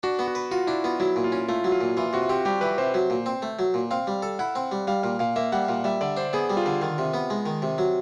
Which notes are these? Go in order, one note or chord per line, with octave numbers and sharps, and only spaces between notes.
D4 F#4
B3
F#4
B4
F4 F#4
D4 E4
B3 F4
F#3 E4
A#2
F4
C#4
A3 F4
F#3
F4
A#2
E3 F4
C3 F#4
C4 G4
G3 G4
E3 B4
C3 C5
F#3
A#2
C4
A3
F#3
A#2
C4 F5
G3
A4
E4 F#5
C4
G3
G3 F5
A#2 F5
A#2 F5
A#3 E5
G3 F#5
A#2 F5
G3 E5
D3 D5
D4 C5
B3 G#4
G3
F4
D3
D#3 F4
C3
B3
G#3
D#3
C3
F#3